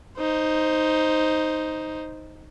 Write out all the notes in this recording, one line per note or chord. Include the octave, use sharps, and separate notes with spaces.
D#4 C5